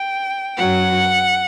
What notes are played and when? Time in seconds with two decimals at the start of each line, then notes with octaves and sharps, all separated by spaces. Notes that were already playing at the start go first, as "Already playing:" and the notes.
Already playing: G5
0.58 F#2 F#3 F#5